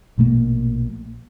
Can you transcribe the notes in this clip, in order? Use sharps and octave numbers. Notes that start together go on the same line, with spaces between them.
A#1 B2 A3 A#3